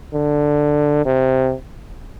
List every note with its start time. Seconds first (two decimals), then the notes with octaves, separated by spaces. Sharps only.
0.14 D3
1.06 C3